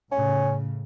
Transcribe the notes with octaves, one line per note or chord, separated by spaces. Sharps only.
A2 C#3 C#4